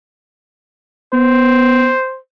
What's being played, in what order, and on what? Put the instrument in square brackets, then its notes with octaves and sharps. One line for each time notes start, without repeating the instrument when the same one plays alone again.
[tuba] B3 [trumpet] C5